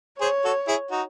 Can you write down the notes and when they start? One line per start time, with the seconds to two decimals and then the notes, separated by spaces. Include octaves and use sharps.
0.21 G#4 C5 C#5
0.45 F#4 A4
0.67 E4 G#4
0.91 D#4 F#4